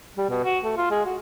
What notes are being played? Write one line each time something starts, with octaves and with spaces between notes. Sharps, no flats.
G3
B2
F#4
A3
F4
G#3
F#4